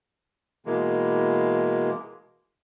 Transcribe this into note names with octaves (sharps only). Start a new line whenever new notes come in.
B2 E3 G#3 A#3